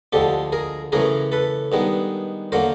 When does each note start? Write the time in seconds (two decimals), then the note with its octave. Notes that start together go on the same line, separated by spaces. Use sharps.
0.13 D2 D3 F3 G#3 G4 A4
0.52 G#4 A#4
0.92 F#2 C#3 E3 A3 G#4 A#4
1.32 A4 B4
1.72 G2 D#3 G#3 B3
2.52 D3 F#3 A#3 A#4 C5